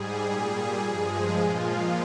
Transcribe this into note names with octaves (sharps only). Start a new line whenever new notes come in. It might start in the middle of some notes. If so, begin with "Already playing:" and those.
Already playing: G#2 G3 G#4
A#2 G3
G2 F3 G#3
A#2 F3 G#3 F4